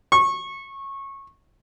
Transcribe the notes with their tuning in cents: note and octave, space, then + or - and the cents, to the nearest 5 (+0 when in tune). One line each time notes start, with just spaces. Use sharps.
C#6 -20